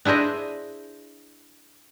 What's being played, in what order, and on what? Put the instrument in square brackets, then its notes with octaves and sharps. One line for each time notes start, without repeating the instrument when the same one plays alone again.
[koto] D4 E4 G#4 C5 D#5